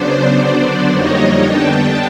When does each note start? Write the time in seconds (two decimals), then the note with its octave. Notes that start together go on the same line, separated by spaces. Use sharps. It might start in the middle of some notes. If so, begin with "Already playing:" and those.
Already playing: C#3 F#3 B3 D4 C5 D5
0.36 D3 F#3 B3 D4 C5 D5
0.88 F2 D3 G3 A#3 D#4 C#5 D#5
1.41 D3 G3 B3 D4 G5 A5